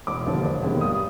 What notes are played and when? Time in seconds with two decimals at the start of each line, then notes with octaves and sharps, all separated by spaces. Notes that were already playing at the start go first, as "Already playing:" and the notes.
0.07 E1 D6
0.26 D#2 D3 F3
0.45 E1
0.63 D#2 D#3 G#3 B3
0.81 G2 D#6